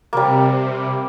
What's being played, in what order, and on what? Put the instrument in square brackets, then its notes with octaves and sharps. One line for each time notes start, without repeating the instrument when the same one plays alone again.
[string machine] C3 [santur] G3 A#3